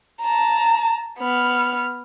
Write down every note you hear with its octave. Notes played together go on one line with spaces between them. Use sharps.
A5 A#5
B3 F6